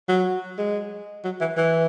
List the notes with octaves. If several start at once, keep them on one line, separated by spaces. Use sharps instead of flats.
F#3
G#3
F#3
E3
E3